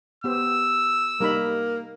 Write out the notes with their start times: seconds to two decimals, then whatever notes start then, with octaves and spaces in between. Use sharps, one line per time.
0.24 B3 G4 C5 E6
1.20 G3 A#3 D#4 B5